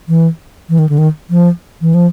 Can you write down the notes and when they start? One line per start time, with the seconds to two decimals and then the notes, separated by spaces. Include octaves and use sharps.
0.08 E3
0.69 E3
0.79 D#3
0.89 D3
0.98 D#3
1.30 F3
1.81 E3
1.94 F3